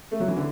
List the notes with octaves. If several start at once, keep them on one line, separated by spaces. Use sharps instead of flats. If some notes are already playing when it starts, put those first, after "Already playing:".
A3
F#3
E3
D3